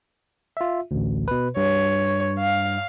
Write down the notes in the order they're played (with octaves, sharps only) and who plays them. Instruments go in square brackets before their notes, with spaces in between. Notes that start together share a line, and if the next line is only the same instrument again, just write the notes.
[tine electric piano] F4 E5
A1 D2
B2 B4
[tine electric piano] G2 [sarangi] C#5
[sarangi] F5